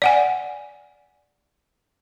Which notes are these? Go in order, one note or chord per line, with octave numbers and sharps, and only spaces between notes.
D5 F#5 G#5